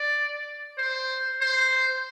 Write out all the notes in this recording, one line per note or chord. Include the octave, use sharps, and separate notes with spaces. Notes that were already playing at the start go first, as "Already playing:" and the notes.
Already playing: D5
C5
C5